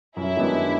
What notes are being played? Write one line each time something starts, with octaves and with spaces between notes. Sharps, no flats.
F#2 E4 E5
D#3 G#3 B3 D4